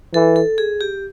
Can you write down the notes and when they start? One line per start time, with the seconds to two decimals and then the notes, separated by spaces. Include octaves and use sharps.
0.14 E3 A4
0.36 A4
0.58 G#4
0.81 G4